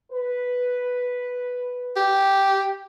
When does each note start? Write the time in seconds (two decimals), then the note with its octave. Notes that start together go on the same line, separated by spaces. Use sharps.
0.12 B4
1.96 G4